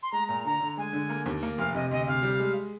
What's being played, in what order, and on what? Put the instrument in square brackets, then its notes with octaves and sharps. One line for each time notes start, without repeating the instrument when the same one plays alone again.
[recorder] C6
[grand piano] G#3 [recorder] A#5
[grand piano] A#2 [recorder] A#5
[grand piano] D3 [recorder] A#5
[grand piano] D3
[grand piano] G#3 [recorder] G#5
[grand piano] D3
A#3
D#2
A#3
[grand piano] F1 [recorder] F5
[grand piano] C3 [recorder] D#5
[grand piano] D2 [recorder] D#5
[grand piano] C3 [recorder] F5
[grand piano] G3
G#3